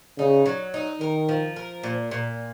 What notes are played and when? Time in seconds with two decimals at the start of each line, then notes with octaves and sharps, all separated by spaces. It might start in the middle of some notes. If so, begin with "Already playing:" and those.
0.18 C#3 D#4
0.46 F#3
0.74 D#4
1.00 D#3 A#4
1.29 F3
1.56 A#4
1.83 A#2
2.11 A#2